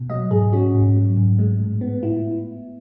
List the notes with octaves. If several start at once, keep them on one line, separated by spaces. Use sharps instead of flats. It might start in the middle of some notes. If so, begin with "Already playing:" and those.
Already playing: B2
F#3 D#5
G#2 G#4
C#4 F#4
G#2
F#3
G#2
G#3
A2
B3
A2 E4